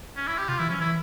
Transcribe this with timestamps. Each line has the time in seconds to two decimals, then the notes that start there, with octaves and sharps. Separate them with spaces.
0.17 C#4
0.27 E4
0.38 G4
0.48 C3 F4
0.59 E3 E4
0.69 F3 C#4
0.80 E3 E4